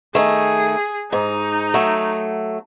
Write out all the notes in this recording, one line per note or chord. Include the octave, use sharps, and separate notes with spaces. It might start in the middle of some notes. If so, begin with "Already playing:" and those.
D#3 A3 G#4
G#2 D#4
F#3 A3